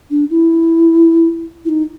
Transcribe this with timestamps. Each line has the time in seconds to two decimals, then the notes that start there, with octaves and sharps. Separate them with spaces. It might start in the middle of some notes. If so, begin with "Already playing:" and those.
0.11 D4
0.30 E4
1.65 E4
1.69 D#4